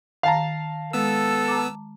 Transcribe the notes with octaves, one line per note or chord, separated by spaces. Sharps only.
D#3 F5 A5 A#5
G#3 B3 A4 E6
A5 A#5 D6